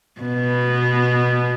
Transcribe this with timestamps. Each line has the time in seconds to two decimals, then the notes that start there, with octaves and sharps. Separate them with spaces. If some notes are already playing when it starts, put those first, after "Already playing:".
0.21 B2 B3